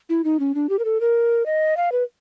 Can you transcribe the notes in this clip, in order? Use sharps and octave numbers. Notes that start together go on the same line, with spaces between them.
E4
D#4
C#4
D4
G4
A#4
A4
A#4
D#5
F5
B4